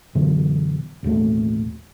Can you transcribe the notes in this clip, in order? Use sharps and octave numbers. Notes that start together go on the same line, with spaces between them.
F#2 B2 D3 E3
A1 D#2 B2 A3